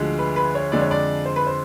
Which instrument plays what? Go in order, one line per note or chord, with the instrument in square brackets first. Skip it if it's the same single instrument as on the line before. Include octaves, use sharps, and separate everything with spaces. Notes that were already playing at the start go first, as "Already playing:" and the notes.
Already playing: [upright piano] D2 D3 F3 G#3
B4
B4
C#5
F2 D3 F3 G#3 D5
C#5
D5
C5
B4
C5